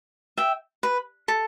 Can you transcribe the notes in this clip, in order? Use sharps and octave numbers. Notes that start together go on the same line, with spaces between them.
E5 G5
B4
A4